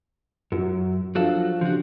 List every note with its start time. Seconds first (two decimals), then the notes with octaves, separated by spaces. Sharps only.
0.52 F#2 F#3
1.15 F3 F#3 D4 F#4 A4 F5
1.61 C#3 F3 D4 F#4 G4